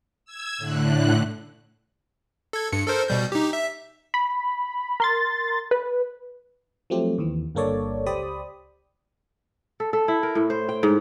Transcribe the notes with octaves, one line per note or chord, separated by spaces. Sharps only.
E6 G#6
A2 D3 F#6
A4 G#6
G2 C#7
A4 A#4 C5
B2 G3 G6
D#4 G4
E5
B5
A#4 C6 A6
B4
F3 F#3 A3 C4 G4
D#2 E3
G1 G2 A#3 A4 C#5 D5
C#2 G4 C5 D5 B5 D#6
A4
A4
E4
A#4
A2
C5
G5
G#2